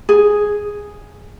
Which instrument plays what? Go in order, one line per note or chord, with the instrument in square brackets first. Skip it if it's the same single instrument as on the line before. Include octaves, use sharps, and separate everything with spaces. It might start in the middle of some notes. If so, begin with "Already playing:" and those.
[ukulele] G#4